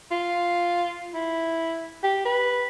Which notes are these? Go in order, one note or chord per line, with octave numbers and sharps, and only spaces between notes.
F4
E4
G4
B4